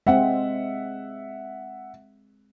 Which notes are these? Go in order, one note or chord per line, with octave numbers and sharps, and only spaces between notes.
G#3 C4 E5 F#5